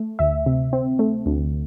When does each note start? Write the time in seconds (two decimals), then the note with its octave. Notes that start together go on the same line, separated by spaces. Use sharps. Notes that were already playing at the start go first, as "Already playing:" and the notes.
Already playing: A3
0.19 D2 E5
0.46 C3
0.73 C4
0.99 A3
1.26 D2